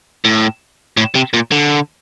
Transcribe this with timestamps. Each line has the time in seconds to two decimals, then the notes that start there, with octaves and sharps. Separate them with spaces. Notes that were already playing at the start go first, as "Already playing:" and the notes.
0.25 A2
0.97 A2
1.15 C3
1.34 A#2
1.52 D3